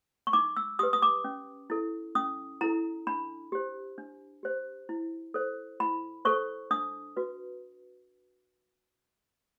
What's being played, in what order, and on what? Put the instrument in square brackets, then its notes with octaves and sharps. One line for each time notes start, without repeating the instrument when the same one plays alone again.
[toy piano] C#6
D#4 D6
E6
G4 B4 D#6
D#6
D6
C#4
E4 A4
C#4 D#6
E4 A4 A#5
D4 B5
G4 C5
D4
G4 C5
E4
A4 C5
E4 B5
A4 C5 C#6
D4 D#6
F#4 B4